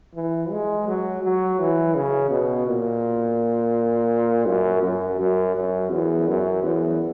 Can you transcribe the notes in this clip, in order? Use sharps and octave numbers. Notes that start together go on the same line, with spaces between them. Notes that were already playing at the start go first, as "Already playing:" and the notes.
E3
G#3
F#3
F#3
E3
C#3
B2
A#2
F#2
F#2
F#2
F#2
E2
F#2
E2